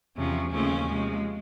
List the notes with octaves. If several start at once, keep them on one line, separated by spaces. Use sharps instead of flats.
E2 C3 F3 C#4
D#2 C#3 F3 A3 C4 C#4
C3 F3 G#3